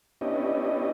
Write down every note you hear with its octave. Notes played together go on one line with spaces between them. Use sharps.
B3 C#4 D4 E4 G4 D#5